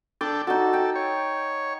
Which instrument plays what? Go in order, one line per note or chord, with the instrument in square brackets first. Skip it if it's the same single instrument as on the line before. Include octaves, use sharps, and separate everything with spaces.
[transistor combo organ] D4 A4 G5 [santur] D6
[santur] D#4 F#4 [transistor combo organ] A4
[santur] G5
[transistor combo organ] C#5